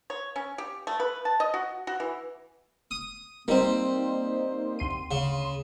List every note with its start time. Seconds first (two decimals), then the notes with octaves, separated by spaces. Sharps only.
0.10 C#5
0.36 C#4
0.58 G4
0.87 A3
1.00 B4
1.25 A5
1.40 D#5
1.54 F#4
1.87 F#4
2.00 E3
2.91 D#6
3.48 G3 A#3 C4 D#4 C5
4.79 D2 C6 D#7
5.11 C#3